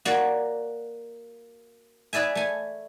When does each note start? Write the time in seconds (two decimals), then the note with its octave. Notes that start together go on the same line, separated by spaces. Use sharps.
0.05 A#3 F#4 C#5 D5
2.13 G#4 B4 D5 E5 G#5
2.35 A3 G#5